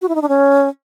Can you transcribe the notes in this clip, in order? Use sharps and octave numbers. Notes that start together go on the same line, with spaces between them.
F#4
E4
D#4
D4
C#4